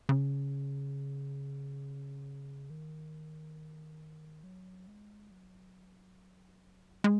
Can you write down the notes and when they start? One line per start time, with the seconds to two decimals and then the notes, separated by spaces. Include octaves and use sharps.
0.09 C#3
2.70 D#3
4.43 F#3
4.87 G#3
5.31 F#3
7.04 G#3